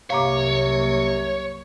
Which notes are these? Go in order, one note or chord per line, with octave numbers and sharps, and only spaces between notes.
C2 F#2 C3 A#3 C#5 F5 A#5 D6